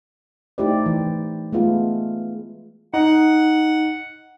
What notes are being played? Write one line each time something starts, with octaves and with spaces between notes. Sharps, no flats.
A3 D#4 E4 G4 C5 D5
E3
G#3 A3 B3 F4
D#4 F#5